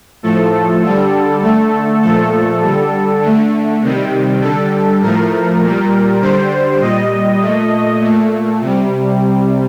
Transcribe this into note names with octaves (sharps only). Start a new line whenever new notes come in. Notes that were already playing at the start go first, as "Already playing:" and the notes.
A2 F3 A3 A4
D3 G3
D3 A3
A#2 F3 A3 A4
D3 G3
D3 A3
C3 D#3 G3
D3 G3 A4
A2 F3 A3 A#4
A#2
G3
D3 G3 C5
A#2 G3 D#5
A#2 A3
A#2 A3
C3 G3